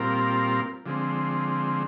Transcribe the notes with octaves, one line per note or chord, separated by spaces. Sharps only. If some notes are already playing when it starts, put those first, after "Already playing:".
Already playing: A#2 G3 C4 F4 A#4
D3 F3 G#3 C4